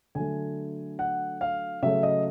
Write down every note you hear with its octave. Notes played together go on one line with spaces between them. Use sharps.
D3 F#3 A3 G#5
F#5
F5
C#3 F#3 A3 E5
D#5